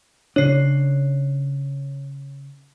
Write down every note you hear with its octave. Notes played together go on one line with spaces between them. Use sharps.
C#3 D4 C#5 C7